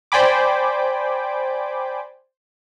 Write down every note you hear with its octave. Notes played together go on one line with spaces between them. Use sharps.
C5 D5 G5 G#5 B5 D6